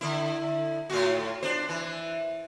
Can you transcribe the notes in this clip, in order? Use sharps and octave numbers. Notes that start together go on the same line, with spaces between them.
D3 E4
A2 F4 F#4
D4 C5
E3